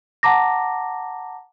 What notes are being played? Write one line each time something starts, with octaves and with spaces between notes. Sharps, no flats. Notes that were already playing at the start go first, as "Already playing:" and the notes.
F#5 A5 A#5 D6 A#6